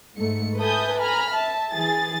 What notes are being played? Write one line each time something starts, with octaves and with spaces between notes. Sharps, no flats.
G#2 A3 C#7
A4 B4 E5 G#5 D#6 G6
G#5 A#5 B5 F6
E5 A5
E3 G#4 A6